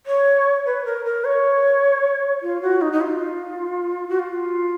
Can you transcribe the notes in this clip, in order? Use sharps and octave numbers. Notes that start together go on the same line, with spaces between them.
C#5
B4
A#4
A#4
C#5
F4
F#4
D#4
D#4
F4
F#4
F4